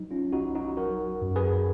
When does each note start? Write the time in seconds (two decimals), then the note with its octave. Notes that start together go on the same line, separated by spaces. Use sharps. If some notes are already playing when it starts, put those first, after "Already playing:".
Already playing: F#3 D#4
0.11 C#4 F4
0.33 B1 D#4 F#4
0.55 D#4 F#4
0.77 F#3 F#4 A#4
1.22 F#2
1.36 G#4 B4